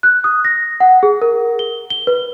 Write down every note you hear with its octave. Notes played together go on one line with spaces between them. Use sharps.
F#6
D#6
A#6
F#5
G#4
A#4
G7
G7
B4